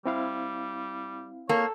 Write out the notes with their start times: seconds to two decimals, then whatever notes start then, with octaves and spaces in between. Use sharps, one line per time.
0.06 G3 C4 E4 F5
1.49 A#3 A4 C#5